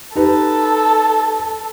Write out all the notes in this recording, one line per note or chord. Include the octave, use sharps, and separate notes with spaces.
D#4 G4 A4 B4